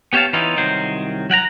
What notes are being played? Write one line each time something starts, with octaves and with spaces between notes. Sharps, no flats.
B3 G4 C#5 E5 F5 A5
E3 B3 C#4 D#4 F4
C2 D#3 F#3 C5
F#3 F#5 G5 A#5